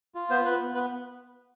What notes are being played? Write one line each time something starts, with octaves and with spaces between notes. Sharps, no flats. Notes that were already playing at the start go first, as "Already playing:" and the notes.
F4
B3 C5
B3 B4
B3
B3 B4